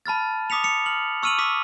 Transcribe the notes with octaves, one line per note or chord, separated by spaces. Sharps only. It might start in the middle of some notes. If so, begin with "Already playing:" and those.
A5 B5 F6 A6
D6 D#6 B6 C#7 F7
C#7 F7
F6 F#7
C#6 E6 F6 D#7 F7 F#7
D6 E6 B6